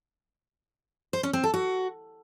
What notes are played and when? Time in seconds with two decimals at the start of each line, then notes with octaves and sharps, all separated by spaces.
1.13 C5
1.23 C#4
1.33 C4
1.43 A4
1.54 F#4